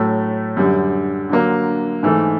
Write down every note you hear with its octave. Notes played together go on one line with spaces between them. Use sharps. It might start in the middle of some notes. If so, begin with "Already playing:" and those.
Already playing: A2 F#3 A3
F#2 D3 G3
D3 F#3 A#3
G#2 E3 A3